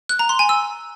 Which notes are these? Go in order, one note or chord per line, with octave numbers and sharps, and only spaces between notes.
F#6
A#5
C6
G#5
E6